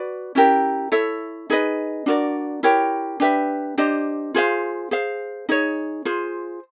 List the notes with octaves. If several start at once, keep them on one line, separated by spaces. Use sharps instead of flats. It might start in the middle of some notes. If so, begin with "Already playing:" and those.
Already playing: F#4 B4 D5
C#4 E4 G4 A#4
E4 A4 C#5 E5
D#4 G#4 B4 D#5
D4 F#4 A#4 D5
E4 G4 A#4 C#5
D4 G4 B4 E5
D4 G4 C5 D#5
F4 G#4 C5 F5
G#4 C5 F5
D#4 G#4 C#5
F4 G#4 C5